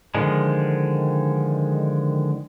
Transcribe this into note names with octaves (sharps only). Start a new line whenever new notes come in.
D3 D#3 F3 G#3